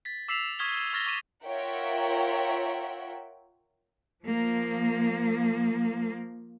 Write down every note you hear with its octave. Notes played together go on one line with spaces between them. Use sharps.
A6 B6
D6 E6 B6 C7 E7 F7
C#6 D#6 F6 G#6 B6 G7
C#6 F6 A6 A#6 G7
C#6 D6 D#7
F4 A#4 C#5 E5 F#5 G5
F3 A#3